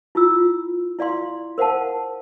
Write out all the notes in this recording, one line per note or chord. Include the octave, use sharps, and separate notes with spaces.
E4 F4 E6
E4 D5 F5 C6
A#4 C5 F5 F#5 A5